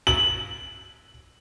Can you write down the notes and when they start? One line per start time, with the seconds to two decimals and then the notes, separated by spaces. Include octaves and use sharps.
0.07 F#7